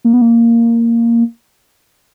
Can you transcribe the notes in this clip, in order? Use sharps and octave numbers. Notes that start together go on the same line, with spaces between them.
A#3
B3
A#3